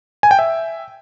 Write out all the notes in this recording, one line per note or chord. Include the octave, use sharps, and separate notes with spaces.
G#5
G5
E5